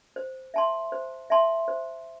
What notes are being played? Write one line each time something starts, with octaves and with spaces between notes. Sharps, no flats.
C5
E5 A5 C6
C5
E5 A5 C6
C5